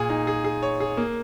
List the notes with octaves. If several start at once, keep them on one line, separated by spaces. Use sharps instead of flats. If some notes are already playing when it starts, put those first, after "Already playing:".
Already playing: A#2 G#4
D#4
G#4
G#4
C#5
G#4
A#3